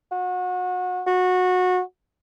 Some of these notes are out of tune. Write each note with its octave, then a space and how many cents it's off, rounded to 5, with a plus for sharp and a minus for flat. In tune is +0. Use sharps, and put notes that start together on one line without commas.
F#4 -30
F#4 -20